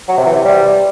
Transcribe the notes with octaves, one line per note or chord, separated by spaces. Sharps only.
F#3
C3
E3
C3
G3